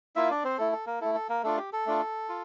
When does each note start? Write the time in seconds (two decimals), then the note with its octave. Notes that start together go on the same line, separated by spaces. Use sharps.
0.16 A#3 E4 F4 E5
0.31 D4 D5
0.44 C4 C5
0.58 A3 E4 A4
0.72 A4
0.86 A#3 A#4
1.01 A3 E4 A4
1.15 A4
1.29 A#3 A#4
1.43 A3 D4 F4 A4
1.57 G4
1.73 A4
1.86 A3 D4 F4
2.29 F4